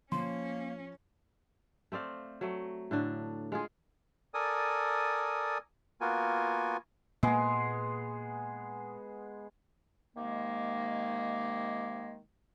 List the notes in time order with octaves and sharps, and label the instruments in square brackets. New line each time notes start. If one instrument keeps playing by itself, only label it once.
[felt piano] F3 [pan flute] A#3 [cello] C#4 [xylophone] C6
[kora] A3 C4 D5 F5
F#3 A3
A2 D3 D4
G#3 F4 G#4
[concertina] A4 A#4 D5 G#5 D#6
A#3 B3 F4 F#4 A#4 G#5
[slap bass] A#2 A#3 [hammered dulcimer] G#3 B3 G#4
[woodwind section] C3 D#3 G#3 A#3